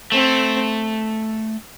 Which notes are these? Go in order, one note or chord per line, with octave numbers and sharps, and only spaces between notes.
A3 C4